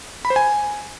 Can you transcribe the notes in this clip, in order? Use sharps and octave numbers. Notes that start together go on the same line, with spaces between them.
B5
C5
G#5